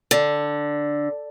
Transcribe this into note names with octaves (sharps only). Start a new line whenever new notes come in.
D3